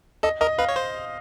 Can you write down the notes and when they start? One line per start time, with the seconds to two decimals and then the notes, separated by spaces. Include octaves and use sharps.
0.23 A4 D#5
0.41 A#4 D#5
0.58 B4 F5
0.69 C#5
0.76 C5